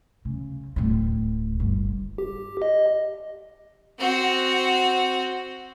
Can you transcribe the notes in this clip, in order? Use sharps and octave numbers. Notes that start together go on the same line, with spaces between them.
C#3
D1 C4
G1
G4
D#5
C4 F#4